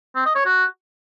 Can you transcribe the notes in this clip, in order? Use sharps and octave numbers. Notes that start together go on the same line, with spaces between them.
C4
D#5
C#5
F#4